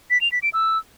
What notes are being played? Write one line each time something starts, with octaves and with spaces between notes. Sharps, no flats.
B6
F7
B6
D7
E6